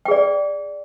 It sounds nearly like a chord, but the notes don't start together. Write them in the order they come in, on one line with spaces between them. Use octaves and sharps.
G5 G#4 D5